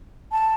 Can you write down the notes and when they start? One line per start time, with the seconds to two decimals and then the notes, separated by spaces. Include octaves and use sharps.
0.31 A5